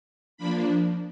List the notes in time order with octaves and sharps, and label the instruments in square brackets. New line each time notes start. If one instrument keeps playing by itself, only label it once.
[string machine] F3 A#3 D4 B5